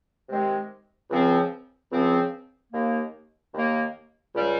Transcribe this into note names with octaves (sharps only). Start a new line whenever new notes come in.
C3 D#3 G#3 C4 G4
C#2 C#3 F3 C4
C#2 C#3 F3 C4
D#2 D#3 A#3
D#2 D#3 A#3
C#2 C#3 G3